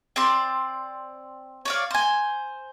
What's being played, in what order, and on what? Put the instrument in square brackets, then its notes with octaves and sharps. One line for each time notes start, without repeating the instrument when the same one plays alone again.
[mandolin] C4 D5 C6
C#5 D5 F5
C5 G#5